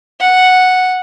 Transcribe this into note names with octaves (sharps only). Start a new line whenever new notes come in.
F#5